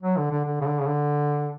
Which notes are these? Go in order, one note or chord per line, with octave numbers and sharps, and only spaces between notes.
F#3
D3
D3
D3
C#3
D3
C#3
D3